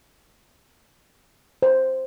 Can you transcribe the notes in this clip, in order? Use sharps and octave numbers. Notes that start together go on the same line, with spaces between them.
C5